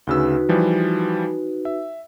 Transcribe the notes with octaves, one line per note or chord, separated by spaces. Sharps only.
D2 C#3 D#4 F#4 B4 E6
E3 F3 G3
E5